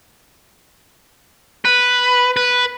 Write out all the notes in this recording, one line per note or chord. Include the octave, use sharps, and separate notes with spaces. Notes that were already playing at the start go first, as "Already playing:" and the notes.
B4
B4